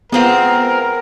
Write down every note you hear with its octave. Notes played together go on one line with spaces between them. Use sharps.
G#3 B3 C4 F4 A#4